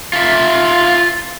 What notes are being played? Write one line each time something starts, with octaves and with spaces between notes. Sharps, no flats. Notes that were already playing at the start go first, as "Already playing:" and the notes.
F4 E5